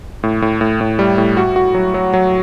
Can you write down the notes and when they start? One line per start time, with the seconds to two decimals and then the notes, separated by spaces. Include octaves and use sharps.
0.23 A2
0.42 A2
0.61 A2
0.81 A2
0.99 G3
1.18 A2
1.37 F#4
1.56 F#4
1.74 F#3
1.94 F#3
2.14 F#3